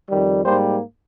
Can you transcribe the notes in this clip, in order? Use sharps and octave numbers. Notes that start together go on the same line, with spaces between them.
F2 D#3 G3
G#2 G3 A#3 C5